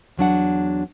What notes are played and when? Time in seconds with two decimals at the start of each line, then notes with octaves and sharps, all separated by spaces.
0.17 E2 F#3 D4 F#5